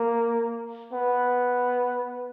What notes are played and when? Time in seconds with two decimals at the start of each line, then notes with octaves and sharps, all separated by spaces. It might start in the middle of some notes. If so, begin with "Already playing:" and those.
Already playing: A#3
0.93 B3